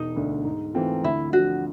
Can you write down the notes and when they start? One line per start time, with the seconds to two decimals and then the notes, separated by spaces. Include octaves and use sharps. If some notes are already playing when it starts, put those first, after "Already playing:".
Already playing: E1 D#4
0.16 D2 D3
0.45 G#2
0.74 E3 A3 C4 F4
1.03 D2 E4
1.33 D3 F3 F#4